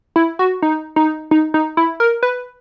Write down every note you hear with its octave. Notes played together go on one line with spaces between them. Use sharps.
E4
F#4
D#4
D#4
D#4
D#4
E4
A#4
B4